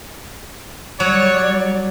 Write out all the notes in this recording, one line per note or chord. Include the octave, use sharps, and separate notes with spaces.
F#3 G3 C#5 D5